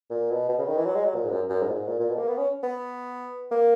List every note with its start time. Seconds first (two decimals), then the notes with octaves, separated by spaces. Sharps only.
0.10 A#2
0.30 B2
0.49 B2
0.59 C#3
0.67 D#3
0.77 E3
0.86 F#3
0.95 G#3
1.05 F#3
1.15 A#2
1.24 G#2
1.32 F#2
1.49 F#2
1.62 G#2
1.69 A#2
1.75 G#2
1.87 A#2
2.00 A#2
2.10 B2
2.19 A#3
2.28 B3
2.38 C#4
2.63 B3
3.51 A#3